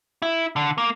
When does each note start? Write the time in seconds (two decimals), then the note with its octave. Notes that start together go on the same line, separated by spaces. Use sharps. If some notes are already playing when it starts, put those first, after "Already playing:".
0.22 E4
0.56 D3
0.78 A#3